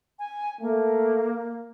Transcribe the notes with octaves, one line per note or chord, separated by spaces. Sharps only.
G#5
A3 A#3